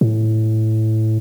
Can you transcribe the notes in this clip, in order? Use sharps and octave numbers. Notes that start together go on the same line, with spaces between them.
A2